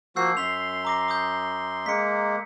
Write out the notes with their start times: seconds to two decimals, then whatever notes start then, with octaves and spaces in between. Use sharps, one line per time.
0.16 F3 A#3 F#4 E6 G6 C7
0.37 F#2 C6 B6 F7
0.85 A#5 D6 A#6
1.08 D6 D#6 G6
1.86 G#3 A#3 B6 C#7